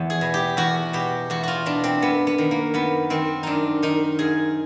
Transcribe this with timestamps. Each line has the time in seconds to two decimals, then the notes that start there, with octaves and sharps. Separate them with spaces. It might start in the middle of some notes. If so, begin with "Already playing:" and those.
Already playing: E2
0.10 G#4
0.21 B2
0.34 G4
0.57 E2 F#4
0.93 B2 G4
1.30 E2 F#4
1.43 F4 F#4
1.66 B2 D4
1.84 C4
2.02 F#2 B3
2.27 B3
2.38 D#3
2.51 A#3
2.74 F#2 B3
3.10 D#3 C4
3.43 F#2 D4 D#4
3.83 D#3 D#4
4.19 F#2 G#4